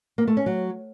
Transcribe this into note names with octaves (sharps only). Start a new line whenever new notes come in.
A#3
A3
C#4
F#3